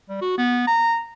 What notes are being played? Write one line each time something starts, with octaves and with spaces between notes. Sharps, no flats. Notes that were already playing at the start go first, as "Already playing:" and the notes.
G3
F#4
B3
A#5